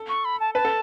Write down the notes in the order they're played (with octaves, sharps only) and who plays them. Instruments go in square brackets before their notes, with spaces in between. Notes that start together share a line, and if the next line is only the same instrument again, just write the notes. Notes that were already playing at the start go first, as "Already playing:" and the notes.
Already playing: [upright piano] A4
[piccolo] C#6
B5
A5
[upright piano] B4 [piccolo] A5
[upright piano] A4